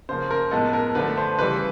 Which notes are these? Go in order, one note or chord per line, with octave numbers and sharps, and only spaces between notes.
C#3 F3 A#3 C5
A#4
A2 F3 G#3 B3 A4
A#4
D3 F3 A3 B4
C5
C#3 E3 G3 B4